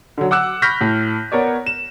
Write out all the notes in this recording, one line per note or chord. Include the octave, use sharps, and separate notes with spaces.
D3 F#3
F#5 D6 E6 F#6
B5 C#6 F6 G6 A#6 B6
A2
B3 A#4 C#5 D5
E7